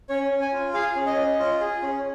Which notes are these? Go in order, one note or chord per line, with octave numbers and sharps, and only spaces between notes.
C#4 C#5
C#4
G#5
F4
G#4 F5
C#4
D#5
C#4
F4
G#4
C#4